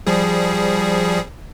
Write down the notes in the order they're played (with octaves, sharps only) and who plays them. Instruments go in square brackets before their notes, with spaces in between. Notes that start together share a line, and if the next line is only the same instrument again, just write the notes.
[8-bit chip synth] F3 G3 G#4